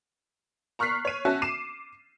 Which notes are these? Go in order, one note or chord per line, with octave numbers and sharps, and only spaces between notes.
A#5 C#6 F6 F#6 B6 C7
C#5 D#7
C#4 F#4 E5 A5
D6 C7 D#7 E7